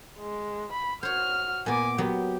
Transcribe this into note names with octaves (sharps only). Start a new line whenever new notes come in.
G#3
B5
F#4 C5 C#5 F6
A#2 B3 G#5 D6
F#3 B3 G4